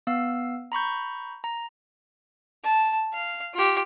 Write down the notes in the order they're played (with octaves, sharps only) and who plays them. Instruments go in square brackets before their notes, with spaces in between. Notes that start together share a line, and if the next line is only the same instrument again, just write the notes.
[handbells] B3 F5 E6
A#5 B5 C#6 G6
A#5
[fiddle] A5
F5
F4 G4